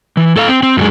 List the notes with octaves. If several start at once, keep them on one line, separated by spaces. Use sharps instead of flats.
E3
A2 A4 D#5 F5
C4
C4
F#2 G3 G#3